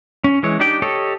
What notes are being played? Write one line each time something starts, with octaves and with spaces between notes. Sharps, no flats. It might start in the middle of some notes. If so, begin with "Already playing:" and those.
C#4
E3 G#3 C#5
D4 D#4 G4 D5 G5
G4 A4 C#5 D#5